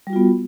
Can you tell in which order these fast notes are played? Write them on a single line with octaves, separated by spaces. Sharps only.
G3 F#4 F4 B3